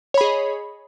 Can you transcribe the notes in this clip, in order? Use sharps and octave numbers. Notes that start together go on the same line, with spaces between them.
G#4 C#5 D#5 B5